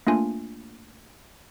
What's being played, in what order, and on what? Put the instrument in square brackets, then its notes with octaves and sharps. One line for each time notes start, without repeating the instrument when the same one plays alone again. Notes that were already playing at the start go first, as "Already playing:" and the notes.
[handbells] A3 A#3 D4 F4 G#5